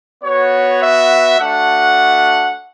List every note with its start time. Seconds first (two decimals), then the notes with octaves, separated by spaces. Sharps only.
0.23 B3 F#4 C#5
0.80 E5
1.39 A3 D4 F#4 F#5